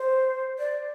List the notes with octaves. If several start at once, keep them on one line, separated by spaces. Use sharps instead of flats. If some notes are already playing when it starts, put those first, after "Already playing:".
Already playing: C5
D5